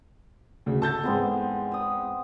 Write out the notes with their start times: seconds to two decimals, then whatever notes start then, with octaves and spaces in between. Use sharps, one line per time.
0.66 D2 C#3
0.82 A4 A5 G6 A6
1.04 E2 G#2 G#3 B3 C4
1.72 D#6 E6